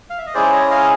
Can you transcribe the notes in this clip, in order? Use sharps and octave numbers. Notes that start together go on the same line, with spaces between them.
F5
E5
D#5
G#3 C#4 E4 G#4 C5 D5
C#5 D#5
D#5 F5